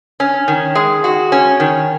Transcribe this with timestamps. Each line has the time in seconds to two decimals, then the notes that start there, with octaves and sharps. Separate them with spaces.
0.20 C#4
0.48 D#3
0.75 G#3
1.04 F#4
1.32 C#4
1.60 D#3